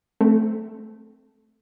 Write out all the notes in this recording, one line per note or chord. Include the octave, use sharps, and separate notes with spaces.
A3 C4